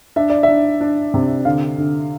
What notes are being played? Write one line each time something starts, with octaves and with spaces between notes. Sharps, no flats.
D4 E5
D5
E5
D4
D4
C3
D3 F5
D3